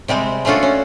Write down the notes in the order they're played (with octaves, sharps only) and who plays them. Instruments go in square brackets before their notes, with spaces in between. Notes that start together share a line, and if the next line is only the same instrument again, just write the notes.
[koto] C3 G3 G#3 C4
A3 C#4 D4 F4 F#4 A4
C#4